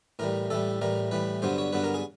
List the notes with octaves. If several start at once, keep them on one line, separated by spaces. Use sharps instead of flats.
A2 E3 G3 A#4
A2 E3 G3 A4
A2 E3 G3 A#4
A2 E3 G3 B4
G2 D3 F#3 B3 C5
C#5
G2 D3 F#3 B3 B4
A#4
G#4